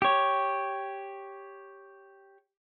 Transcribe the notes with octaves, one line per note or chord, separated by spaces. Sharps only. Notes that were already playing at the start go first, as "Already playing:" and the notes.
G4 C#5